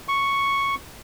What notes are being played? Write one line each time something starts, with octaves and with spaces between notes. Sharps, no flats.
C#6